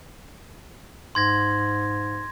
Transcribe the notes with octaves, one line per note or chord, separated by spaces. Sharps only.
G#2 C6 G#6 A#6